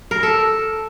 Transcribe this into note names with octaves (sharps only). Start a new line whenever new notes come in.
A#4
A4